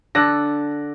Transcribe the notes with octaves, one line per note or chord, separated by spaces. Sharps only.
D3 A4 D6 F#6 A#6